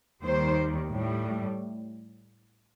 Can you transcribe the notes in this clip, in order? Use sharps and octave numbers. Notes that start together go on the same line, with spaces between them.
D#2 D#3 G3 C5
A2
G3